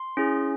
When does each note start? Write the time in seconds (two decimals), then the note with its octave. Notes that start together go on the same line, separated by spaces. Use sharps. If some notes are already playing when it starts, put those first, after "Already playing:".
Already playing: C6
0.17 C#4 E4 G#4